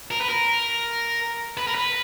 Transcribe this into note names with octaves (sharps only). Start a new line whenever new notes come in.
A#4
B4
A#4
B4
A#4
B4